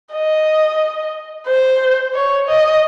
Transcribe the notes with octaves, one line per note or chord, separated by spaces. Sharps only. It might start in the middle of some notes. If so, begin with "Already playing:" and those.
D#5
C5
C#5
D#5